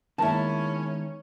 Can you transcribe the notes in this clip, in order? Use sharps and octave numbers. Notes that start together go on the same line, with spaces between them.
D#3 G#3 A#3 B3 C#4 E4 A5